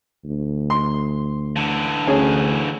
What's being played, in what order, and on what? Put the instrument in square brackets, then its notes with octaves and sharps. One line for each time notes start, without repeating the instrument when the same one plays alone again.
[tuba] D2
[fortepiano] C6
[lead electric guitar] D3 E3
[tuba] D2 [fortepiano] C#4 G#4